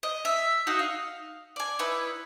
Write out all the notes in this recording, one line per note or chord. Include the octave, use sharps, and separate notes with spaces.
D#5
E5
D#4 F#4 D#5 F5
F5
D5 G#5
D#4 E4 B4